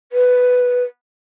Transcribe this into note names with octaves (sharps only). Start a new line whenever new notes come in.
B4